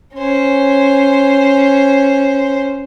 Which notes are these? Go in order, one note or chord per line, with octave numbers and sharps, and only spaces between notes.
C#4 C5